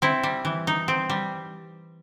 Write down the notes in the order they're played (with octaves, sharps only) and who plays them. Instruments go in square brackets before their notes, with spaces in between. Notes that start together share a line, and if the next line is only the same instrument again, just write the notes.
[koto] C4 E4
G3
E3
D#4
C4
G3